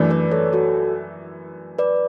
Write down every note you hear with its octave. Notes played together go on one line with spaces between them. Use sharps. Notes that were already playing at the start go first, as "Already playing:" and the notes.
Already playing: F#2 E3 A3 D4
B4 D5
A4 C#5
F#4 A4
B4 D5